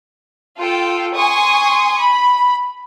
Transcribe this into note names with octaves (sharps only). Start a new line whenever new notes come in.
F4 A4 G5
G#5 C6 C#6 D#6
B5